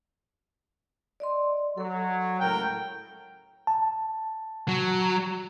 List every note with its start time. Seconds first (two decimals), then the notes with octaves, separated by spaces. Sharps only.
1.20 D5 D#5 C6
1.78 F#3 A4
2.40 C#2 A2 A#4 G5
3.67 A5
4.68 F#3